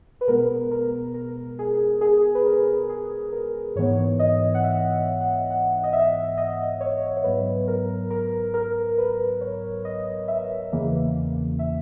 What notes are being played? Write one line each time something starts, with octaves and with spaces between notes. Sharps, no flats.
B4
B2 G#3 B3 A#4
A#4
A#4
G#4
G#4
B4
A#4
G#4
A#4
G#2 E3 B3 C#5
D#5
F#5
E5
F#5
F#5
D#5
E5
D#5
C#5
C#5
G#2 F#3 B3 B4
A#4
A#4
A#4
B4
C#5
D#5
E5
E2 C#3 E3 A#3
E5